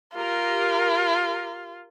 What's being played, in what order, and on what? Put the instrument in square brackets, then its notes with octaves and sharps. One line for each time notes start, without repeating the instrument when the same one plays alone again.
[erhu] F4 [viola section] G4 A#4